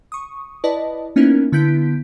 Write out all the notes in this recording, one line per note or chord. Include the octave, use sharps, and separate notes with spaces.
C#6 D#6
E4 B4 D5 D#5 A5
A#3 B3 C#4 D#4 E4 A#4
D3 B3 E4 G6 B6 D7